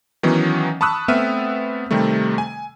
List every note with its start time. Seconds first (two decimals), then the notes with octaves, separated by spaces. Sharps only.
0.23 D#3 E3 F#3 B3 C#4 D#4
0.81 A5 B5 C#6 D#6 E6 F#6
1.08 A3 B3 C4 E5 F6 D#7
1.91 C3 D#3 G3 A3
2.38 G#5